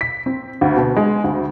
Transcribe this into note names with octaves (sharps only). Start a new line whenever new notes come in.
B6
C4
D2
B2
G#3
D2